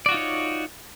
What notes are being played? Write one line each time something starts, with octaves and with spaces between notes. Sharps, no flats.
D#4 F4 F#4 C#5 D5